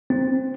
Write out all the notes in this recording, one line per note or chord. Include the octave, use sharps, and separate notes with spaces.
C4